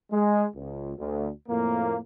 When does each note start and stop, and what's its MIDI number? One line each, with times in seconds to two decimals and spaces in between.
0.11 0.46 56
0.54 0.93 37
0.97 1.30 38
1.48 1.97 41
1.48 1.97 45
1.48 1.97 58